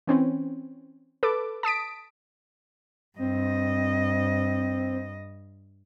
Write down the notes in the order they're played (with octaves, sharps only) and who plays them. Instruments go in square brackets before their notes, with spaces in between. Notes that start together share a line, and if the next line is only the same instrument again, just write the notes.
[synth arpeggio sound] E3 C4 C#4
A4 B4 D6
A5 D#6 B6 D7
[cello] G2 D#5 [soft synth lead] C4